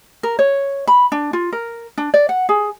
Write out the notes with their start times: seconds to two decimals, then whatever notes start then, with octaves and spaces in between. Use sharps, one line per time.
0.23 A#4
0.39 C#5
0.88 B5
1.12 D4
1.33 F4
1.53 A#4
1.98 D4
2.14 D5
2.29 F#5
2.49 G#4